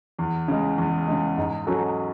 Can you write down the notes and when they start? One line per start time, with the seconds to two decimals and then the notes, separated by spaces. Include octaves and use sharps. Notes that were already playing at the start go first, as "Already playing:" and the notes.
0.19 E2
0.48 C#3 G#3
0.78 E2
1.08 C#3 G#3
1.38 G#2
1.67 F#3 C#4 F#4 A4